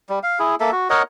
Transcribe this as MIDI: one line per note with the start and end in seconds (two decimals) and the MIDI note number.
0.09 0.19 55
0.23 0.39 77
0.39 0.55 64
0.39 0.55 68
0.60 0.71 58
0.60 0.71 69
0.60 0.71 76
0.72 0.88 66
0.90 1.02 70
0.90 1.02 73
0.90 1.02 75
0.90 1.02 78